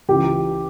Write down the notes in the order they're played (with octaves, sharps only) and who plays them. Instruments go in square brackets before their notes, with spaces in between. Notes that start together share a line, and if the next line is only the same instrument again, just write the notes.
[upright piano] C#2 C#3 E3 G4